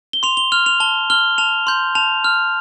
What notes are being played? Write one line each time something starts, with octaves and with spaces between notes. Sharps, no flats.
G7
C6 F7
G7
F6 F7
F7
A5 G7
F6 G7
A5 F7
C6 G6
A5 F7
F6